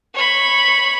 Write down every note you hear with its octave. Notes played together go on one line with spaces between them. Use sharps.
C#5 B5